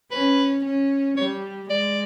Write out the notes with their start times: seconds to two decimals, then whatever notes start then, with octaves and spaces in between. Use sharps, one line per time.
0.11 C#4 B4
0.64 C#4
1.17 G3 C#5
1.70 G#3 D5